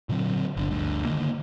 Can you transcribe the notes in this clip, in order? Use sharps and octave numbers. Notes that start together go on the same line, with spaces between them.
A#2 D3 F#3 C4
G1 D3
D2 G2
D3 D#3 A#3